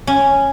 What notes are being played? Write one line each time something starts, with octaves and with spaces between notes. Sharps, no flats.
C#4